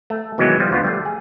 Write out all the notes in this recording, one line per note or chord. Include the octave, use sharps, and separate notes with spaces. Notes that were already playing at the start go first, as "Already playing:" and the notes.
A3
B2 D#3 E3 F#3 G#3 B3
F3 G3
D2 B3 F4
G3 A3
G#4